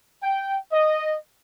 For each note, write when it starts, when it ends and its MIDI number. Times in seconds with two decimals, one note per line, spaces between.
0.23 0.57 79
0.72 1.16 75